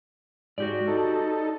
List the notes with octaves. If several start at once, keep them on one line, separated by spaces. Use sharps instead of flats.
G#2 F#4 G4 D5
D#4 A4